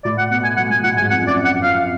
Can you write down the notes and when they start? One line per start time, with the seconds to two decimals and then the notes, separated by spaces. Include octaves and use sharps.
0.04 A2 D5
0.18 F#5
0.31 B2 F#5
0.44 G#5
0.57 F#3 F#5
0.70 F#3 G#5
0.83 A2 F#5
0.97 G#2 G#5
1.10 F2 F#5
1.23 F#2 D5
1.37 F#2
1.45 F#5
1.49 F2
1.63 F2 F5